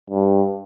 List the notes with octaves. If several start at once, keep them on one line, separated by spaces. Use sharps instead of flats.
G2